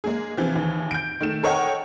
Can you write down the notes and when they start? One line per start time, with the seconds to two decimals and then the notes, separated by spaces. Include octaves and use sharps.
0.04 G#3 A#3 G#4
0.37 C3 E3 F3
0.55 D#2 E3
0.91 G6 D7
1.21 D#3 A3 E7
1.43 A4 A#4 C#5 D#5 F#5 G5